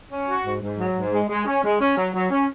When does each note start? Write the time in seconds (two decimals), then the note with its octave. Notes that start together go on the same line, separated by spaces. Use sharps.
0.10 C#4
0.27 F#4
0.44 G#2
0.61 G#2
0.78 F#3
0.95 G#2
1.12 G#3
1.29 G#3
1.45 C#4
1.63 G#3
1.80 C#4
1.97 F#3
2.14 F#3
2.30 C#4